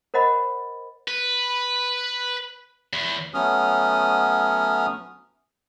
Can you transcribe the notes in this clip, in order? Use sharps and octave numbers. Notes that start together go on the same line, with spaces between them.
A#4 C5 D#5 F#5 B5
B4
E2
F#3 A3 B3 C#4 D#6 F6